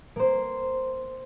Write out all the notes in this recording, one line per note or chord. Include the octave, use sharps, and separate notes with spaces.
A#3 C5